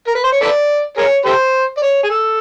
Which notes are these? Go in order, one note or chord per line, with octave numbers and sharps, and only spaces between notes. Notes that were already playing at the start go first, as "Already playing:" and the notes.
A#4
B4
C5
C#5
A4 B4 D5
G#4 A#4 C#5
G4 A4 C5
D5
C#5
G#4
A4